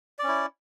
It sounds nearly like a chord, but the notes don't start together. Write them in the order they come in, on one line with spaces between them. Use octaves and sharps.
D5 C#4 E4